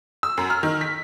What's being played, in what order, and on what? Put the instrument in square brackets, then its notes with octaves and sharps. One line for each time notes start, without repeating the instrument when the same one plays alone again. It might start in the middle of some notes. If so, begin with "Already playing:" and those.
[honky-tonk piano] E6
F#2
F6
D#3
B6